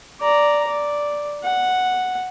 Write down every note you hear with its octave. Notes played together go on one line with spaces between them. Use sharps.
D5 A#5
D5
F#5